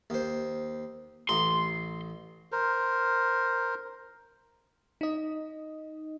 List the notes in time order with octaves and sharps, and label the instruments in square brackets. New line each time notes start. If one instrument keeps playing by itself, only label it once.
[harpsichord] D#2 C5
[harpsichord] A1 A#5 [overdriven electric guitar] C6
[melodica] A#4 C5
[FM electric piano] D#4 D#5